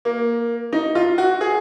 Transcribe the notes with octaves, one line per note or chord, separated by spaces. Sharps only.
A#3
D#4
F4
F#4
G#4